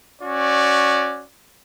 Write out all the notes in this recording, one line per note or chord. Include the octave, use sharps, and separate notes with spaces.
C#4 F#4 D5